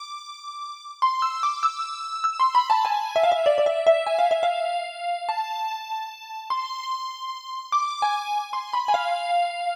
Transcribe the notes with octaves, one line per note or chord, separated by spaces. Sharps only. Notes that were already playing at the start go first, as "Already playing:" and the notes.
Already playing: D6
C6
E6
D6
E6
E6
C6
B5
A5
G#5
E5
F5
E5
D5
D5
E5
E5
G#5
F5
E5
F5
A5
C6
D6
G#5
C6
B5
G#5
F5